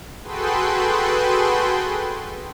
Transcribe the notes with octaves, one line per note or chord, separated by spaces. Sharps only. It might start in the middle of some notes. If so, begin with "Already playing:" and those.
F#4 G#4 A4 B4 G5 C6